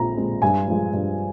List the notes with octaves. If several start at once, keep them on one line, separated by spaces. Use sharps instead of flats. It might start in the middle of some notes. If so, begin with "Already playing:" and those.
Already playing: A#1 A#2 G#3 C4 A#5
A#2 G#3 C4
G2 G#5
F3 G#3
G2